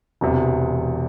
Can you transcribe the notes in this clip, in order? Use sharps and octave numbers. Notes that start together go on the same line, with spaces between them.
E1 E2 C3